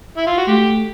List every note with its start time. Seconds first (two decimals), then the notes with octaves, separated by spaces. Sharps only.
0.17 E4
0.27 F4
0.37 F#4
0.47 A3 G4